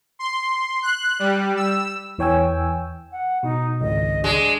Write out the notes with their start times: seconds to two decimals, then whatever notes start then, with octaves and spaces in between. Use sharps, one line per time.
0.19 C6
0.82 F#6
1.19 G3
1.56 E6
2.18 E2 E3 C#5 G5 G#5 E6
3.12 F#5
3.43 B2 D#4
3.81 G#1 C#2 D#5
4.24 G#3 D4